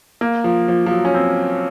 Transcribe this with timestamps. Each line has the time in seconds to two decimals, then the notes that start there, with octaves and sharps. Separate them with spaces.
0.21 A#3
0.44 F3
0.68 F3
0.86 F3
0.91 F#3
1.05 C#4
1.15 C4